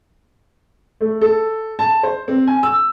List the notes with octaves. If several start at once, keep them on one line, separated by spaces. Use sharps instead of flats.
A3
A4
A5
C5
C4
G#5
E6